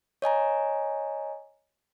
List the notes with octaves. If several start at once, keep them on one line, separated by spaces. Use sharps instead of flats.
C#5 D#5 G#5 A#5